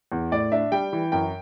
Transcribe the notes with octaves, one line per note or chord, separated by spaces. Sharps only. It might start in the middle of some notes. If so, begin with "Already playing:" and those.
E2
A2 D5
D4 E5
G3 G5
E3
F#2 G5